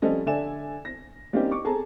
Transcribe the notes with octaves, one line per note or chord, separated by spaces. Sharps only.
F3 G3 C4 C#4 A4 D#5
D3 A4 D5 E5 G#5 E7
A#6
G3 A#3 C4 C#4 D#4 G4
C#6 D6
G#4 A4 A5 A#5